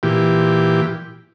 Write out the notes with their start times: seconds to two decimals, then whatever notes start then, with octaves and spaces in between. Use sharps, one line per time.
0.03 A#2 E3 G4